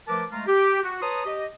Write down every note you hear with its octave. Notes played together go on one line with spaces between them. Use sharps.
F3 A3 A#4 B4 A5 D6
G#3 A3 F4 A#5
G4
F#4
B4 C#5 A5 A#5 C6 D#6
G4 D#5